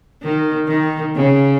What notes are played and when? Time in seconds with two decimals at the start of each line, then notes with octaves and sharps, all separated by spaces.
0.23 D#3
0.68 D#3
1.15 C#3